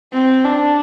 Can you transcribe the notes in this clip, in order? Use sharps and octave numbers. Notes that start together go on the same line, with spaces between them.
C4
D4